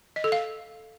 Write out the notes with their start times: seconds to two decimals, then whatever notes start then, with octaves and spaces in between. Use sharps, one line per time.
0.16 D#5
0.24 A4
0.32 F5